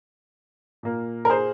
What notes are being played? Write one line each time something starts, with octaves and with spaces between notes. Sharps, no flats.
A#2 A#3
A#4
G#4 C5